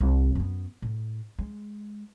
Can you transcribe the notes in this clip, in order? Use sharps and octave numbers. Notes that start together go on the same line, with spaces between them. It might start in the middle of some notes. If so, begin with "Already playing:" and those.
C2
F#2 B3
A2
G#3